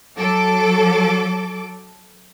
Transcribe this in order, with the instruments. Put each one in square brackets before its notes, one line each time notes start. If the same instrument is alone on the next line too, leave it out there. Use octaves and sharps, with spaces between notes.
[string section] F#3 A4 D6